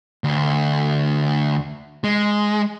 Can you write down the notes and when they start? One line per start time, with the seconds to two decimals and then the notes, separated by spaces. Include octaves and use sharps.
0.24 D2
2.04 G#3